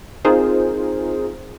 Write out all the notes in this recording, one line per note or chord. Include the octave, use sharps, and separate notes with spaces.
C4 D#4 F4 G#4 A#4 C5